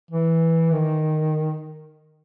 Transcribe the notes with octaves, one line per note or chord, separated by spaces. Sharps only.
E3
D#3